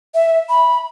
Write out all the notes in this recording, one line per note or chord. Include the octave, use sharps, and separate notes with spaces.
E5
B5